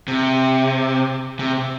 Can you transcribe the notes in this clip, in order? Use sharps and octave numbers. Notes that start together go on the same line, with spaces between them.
C3
C3